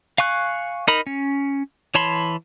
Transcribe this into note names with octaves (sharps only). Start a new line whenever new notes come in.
F5 G#5 C#6 F#6
D#4 A#4 B5
C#4
E3 C#5 A5 B5 C6